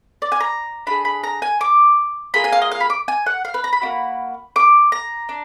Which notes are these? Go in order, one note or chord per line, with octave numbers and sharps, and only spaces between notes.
D5
G#5
A#5
D4 F4 G#4 B5
B5
A#5
G#5
D6
A#3 F4 G#4 B5
G#5
F5
D#5
F5
B5
D6
G#5
F#5
F5
B4
A#5
B5
A#3 D4 F#4
D6
A#5
D4